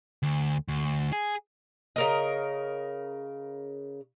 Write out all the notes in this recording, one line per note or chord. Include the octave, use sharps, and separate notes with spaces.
D2
D2
G#4
C#3 A#4 D#5